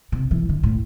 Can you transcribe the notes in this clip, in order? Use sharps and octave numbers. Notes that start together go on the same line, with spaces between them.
C3
E3
D3
A2